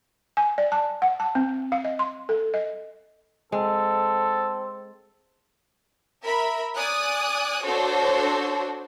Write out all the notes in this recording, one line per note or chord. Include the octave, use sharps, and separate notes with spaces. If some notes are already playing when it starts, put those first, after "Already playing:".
G#5
D5
A5
F#5
A5
C4
F5
D#5
C6
A4
D#5
G#3 C4 A4
A#4 E5 B5
D5 G#5 D#6 F#6
D4 F#4 A4 C5 C#5